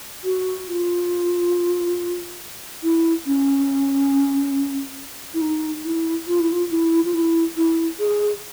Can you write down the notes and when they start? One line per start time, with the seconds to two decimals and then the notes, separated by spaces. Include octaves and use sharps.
0.24 F#4
0.68 F4
2.83 E4
3.27 C#4
5.34 E4
5.41 D#4
5.85 E4
6.27 F4
6.40 E4
6.52 F4
6.71 E4
7.05 F4
7.14 E4
7.57 E4
8.00 G#4